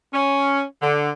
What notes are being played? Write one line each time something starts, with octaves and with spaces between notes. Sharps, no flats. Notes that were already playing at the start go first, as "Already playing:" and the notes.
C#4
D3